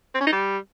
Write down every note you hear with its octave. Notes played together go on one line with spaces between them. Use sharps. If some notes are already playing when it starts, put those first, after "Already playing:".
C4
C#4
D#4
G3